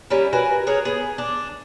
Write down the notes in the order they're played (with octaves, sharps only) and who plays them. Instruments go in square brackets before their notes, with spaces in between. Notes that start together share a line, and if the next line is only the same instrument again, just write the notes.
[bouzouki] G3 C#4 E4 A#4
F#4 A#4 B4 G#5
G#4 A#4 C#5
B3 G#4
D4